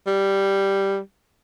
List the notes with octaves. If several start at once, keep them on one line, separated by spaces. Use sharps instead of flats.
G3